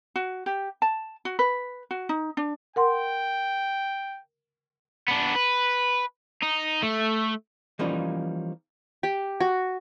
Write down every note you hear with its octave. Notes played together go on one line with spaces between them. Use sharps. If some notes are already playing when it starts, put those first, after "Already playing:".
F#4
G4
A5
F#4
B4
F#4
D#4
D4
A#4 F#5 G5 C6
B3 D4
B4
D#4
A3
E3 F3 G3 A#3 C#4 D#4
G4
F#4